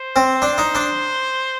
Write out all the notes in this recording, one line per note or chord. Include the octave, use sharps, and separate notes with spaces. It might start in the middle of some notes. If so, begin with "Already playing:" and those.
Already playing: C5
C4
D4
D#4
D4